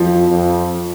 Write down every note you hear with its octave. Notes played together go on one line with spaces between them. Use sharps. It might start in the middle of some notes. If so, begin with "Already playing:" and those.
Already playing: F2 F3
F2